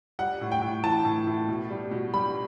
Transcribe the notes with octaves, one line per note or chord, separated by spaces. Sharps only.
G3 F#5
A2
G5
A2
E3 A5
A2
A2
B2
G3
B2
G3 B5